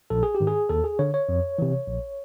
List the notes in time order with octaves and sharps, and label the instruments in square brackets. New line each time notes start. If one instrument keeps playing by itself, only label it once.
[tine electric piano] A#1 A4
G#4
G4
G#2 D#3
G#4
D#2 A4
G#4
D3 C#5
C#5
F2
C3 E3
A#1